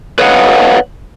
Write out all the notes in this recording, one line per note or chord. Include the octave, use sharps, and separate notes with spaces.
B4 C#5 D#5 F5 F#5